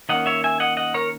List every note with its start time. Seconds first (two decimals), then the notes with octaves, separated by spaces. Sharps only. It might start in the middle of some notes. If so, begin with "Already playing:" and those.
0.09 D#3 A#3 C#4 D#5 F#5
0.26 C#5 E5
0.44 E5 G#5
0.60 D#5 F#5
0.77 D#5 F#5
0.94 A#4 C#5